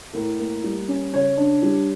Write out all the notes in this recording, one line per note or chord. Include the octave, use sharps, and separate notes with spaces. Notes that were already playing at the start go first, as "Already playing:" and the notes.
A2 A#4
A#3
G3
C#4
C#3 C#5
D4
G3